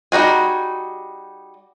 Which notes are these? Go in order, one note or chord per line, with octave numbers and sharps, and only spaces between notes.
G3 D#4 F#4 G#4